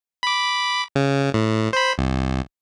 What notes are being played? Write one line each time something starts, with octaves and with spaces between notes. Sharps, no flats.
B5 D6
C#3
A2
C5 B5
C2